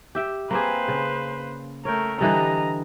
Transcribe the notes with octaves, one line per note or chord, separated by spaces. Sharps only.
G4 E5 G5
A#3 C4 G#4 B4 C5
C#3
A3 A#4 C#5 G5
D3 E3 G3 D#5 A#5